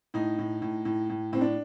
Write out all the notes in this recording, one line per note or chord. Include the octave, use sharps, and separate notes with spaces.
A2 D#4
A2
A2
A2
A2
A2 C4
D4